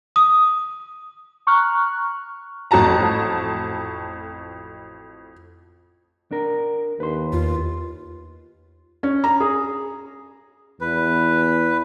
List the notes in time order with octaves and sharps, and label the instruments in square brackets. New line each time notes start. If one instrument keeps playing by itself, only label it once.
[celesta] D#6
[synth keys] A#5 C#6 F6 F#6
[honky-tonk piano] A1 F2 F#4 A5 A#5
[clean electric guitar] D4 A#4
[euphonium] D#2 [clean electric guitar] B4 C6
[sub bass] E2 [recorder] F4
[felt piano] C#4
A#5
G#4
[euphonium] E2 [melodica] B4